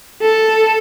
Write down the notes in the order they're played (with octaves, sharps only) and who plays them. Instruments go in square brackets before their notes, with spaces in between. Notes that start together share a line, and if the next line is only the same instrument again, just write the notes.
[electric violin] A4